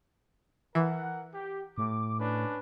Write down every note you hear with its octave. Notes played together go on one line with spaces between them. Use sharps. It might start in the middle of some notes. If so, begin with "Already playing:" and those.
E3 A#4 F#5
G4
A2 D6
C#4 D4 B4